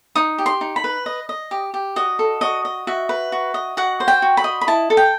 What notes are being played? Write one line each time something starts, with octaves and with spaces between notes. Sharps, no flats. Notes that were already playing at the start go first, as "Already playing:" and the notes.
D#4 D#6
G4
C6
D#4
B5
B4
D#5
D#5
G4
G4
F#4 D#5
A4
F#4 D#5
D#5
F#4 E5
B4
F#4
D#5
F#4 F#5
C5
G5
F#4
B5
D#5
B5
E4 A5
A4
G5